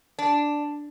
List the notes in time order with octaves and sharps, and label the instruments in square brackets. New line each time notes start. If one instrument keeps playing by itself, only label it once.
[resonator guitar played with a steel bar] D4